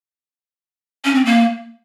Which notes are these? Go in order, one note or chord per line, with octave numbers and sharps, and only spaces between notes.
C#4
C4
A#3